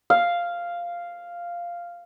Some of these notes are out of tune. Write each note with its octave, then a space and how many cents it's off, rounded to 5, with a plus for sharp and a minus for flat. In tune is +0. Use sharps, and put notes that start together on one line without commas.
F5 -5